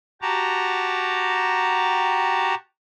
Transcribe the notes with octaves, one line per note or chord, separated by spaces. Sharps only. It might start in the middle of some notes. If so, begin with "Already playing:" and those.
F#4 G4 A5 A#5